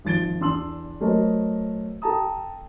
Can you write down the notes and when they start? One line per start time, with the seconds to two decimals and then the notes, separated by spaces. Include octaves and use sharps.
0.05 G#1 F3 A6 D7 G7
0.40 E2 D4 C6 E6 F#7
1.00 F#3 A3 A4 A#4 C5 D#5
2.02 A4 G5 A5 A#5 D#6